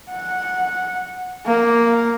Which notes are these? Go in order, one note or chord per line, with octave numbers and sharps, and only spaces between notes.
F#5
A#3